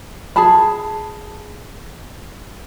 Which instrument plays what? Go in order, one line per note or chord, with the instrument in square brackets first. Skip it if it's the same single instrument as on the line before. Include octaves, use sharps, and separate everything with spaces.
[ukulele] G#4 A5 B5